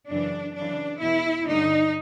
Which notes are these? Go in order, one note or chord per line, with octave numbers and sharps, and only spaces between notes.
F#2 C#3 E3 D4
F#2 C#3 E3 D4
E2 B2 E4
G2 D3 D#4